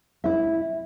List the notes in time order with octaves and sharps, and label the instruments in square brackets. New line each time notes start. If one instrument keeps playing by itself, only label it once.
[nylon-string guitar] E4 E5